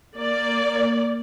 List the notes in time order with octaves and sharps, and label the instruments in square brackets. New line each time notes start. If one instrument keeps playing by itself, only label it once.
[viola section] A#3 D5